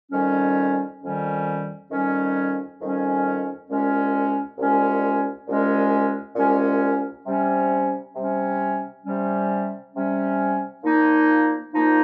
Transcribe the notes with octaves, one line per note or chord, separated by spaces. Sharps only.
F2 D#3 G3 C#4
F2 D#3 G3 C#4
F2 D#3 G3 C#4
F2 D#3 G3 C#4
C2 A#2 G#3 C#4
C2 A#2 G#3 C#4
C2 A#2 G#3 C#4
C2 A#2 G#3 C#4
C3 G3 C#4
C3 G3 C#4
C3 G3 C#4
C3 G3 C#4
A#2 F3 A#3 D#4
A#2 F3 A#3 D#4